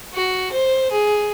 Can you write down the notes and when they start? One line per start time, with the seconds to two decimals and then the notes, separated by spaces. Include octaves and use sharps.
0.14 F#4
0.53 C5
0.92 G#4